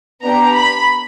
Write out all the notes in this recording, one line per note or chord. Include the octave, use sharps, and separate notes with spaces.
B3 D4 G4 A#5
B5